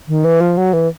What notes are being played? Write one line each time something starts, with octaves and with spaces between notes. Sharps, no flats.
D#3
E3
F3
F#3
E3